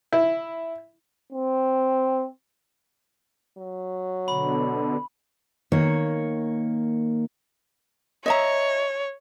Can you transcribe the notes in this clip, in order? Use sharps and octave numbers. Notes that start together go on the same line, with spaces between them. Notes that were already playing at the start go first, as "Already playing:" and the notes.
E4
C4
F#3
B2 D3 B5
D#3 A#3 C#5
C#5 D#5 E5 A#5